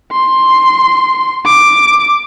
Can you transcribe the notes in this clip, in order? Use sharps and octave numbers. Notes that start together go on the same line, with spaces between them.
C6
D6